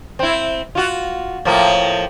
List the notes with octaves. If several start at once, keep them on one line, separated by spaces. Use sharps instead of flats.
C4 E4
F4 F#4
A2 F3 A#3